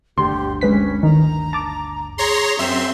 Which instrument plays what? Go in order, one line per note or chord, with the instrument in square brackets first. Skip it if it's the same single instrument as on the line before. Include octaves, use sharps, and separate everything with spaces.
[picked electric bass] G1 D2 [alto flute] G4 [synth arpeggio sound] C6
[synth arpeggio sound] G#3 B4 B6 [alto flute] C#4
[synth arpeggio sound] D#3 [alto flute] A#5
[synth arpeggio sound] A5 D6
[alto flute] G#4 [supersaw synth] C#5 A#5 C6
[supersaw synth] F#2 E5 C6 [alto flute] C4